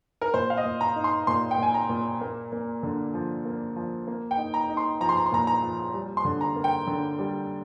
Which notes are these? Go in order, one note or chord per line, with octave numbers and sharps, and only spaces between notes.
A#4
A#2 C5
F5
D#5
A#2
A#5
D#4
C6
A#2 C6
G5
A#2 G#5
A#5
A#2
A#3
A#3
D3
F3
A#3
F3
A#3
G5
D#4
A#5
D#4
C6
F3 A#5
C6
A#5
C6
A#2 A#5
A#5
F3
G3
C6
D3
A#5
A#3
G5
D3
G3